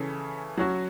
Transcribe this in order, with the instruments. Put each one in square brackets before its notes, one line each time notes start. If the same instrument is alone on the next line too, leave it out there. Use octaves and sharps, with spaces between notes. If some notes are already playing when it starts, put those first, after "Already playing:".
Already playing: [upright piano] C#3 E3 C#4 A4
F#3 C#4 F#4